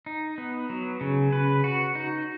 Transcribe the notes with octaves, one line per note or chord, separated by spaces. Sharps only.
D#4
B3
F#3
C#3
B4
F#4
D#4